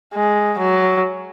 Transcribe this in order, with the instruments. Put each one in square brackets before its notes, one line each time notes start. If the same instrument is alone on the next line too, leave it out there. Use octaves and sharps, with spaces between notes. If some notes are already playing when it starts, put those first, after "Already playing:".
[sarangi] G#3
F#3